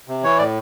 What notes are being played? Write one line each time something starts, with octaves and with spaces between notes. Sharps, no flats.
C3
E3 C#5
A2 D5